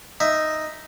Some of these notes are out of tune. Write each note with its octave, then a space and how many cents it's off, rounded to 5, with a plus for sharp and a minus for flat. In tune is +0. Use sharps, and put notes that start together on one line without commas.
D#4 +0 E5 +0